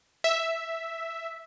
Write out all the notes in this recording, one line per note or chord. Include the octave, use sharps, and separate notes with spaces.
E5